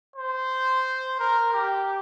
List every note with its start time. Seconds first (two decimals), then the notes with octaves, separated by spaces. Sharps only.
0.16 C5
1.20 A#4
1.54 G4